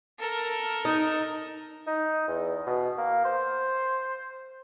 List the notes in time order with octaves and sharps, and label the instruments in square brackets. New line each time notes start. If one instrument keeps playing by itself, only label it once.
[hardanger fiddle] A4 A#4
[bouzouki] D#4
[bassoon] D#4
E2
B2
A#3
C5